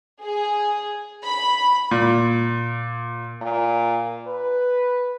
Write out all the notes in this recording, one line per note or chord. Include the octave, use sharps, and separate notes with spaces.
G#4
B5
A#2
A#2
B4